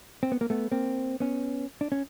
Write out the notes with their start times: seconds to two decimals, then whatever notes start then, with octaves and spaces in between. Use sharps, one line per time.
0.23 C4
0.32 B3
0.41 A#3
0.50 A3 B3
0.71 A#3 C4
1.20 B3 C#4
1.81 D4
1.92 C#4